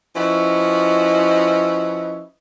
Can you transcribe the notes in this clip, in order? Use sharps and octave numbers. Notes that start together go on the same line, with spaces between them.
F3 C#4 E4 F#4 B4 D#5